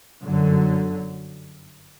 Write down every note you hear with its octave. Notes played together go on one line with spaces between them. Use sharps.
G1 F#2 D3 F#3